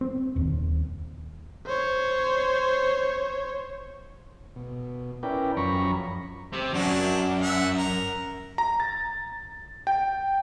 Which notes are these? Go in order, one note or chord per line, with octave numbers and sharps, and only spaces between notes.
C4
D#1 D#2
C5 C#5
B2
C#4 E4 A#4 B4 D5 G5
F#2 F3 C#4 A#5 B5 C#6
C3
F#2 F#3 D4 F#4
E5 F#5
A#4
A#5
A6
G5